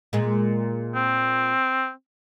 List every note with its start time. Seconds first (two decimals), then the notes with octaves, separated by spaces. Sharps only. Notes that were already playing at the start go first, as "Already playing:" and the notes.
0.13 A#2 G#3
0.94 C4